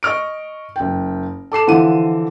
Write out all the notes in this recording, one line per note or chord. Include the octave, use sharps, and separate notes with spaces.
D#5 C#6 F6 D7
F#1 G5
A4 D6 C7 E7
D3 E3 F3 F#5 D#7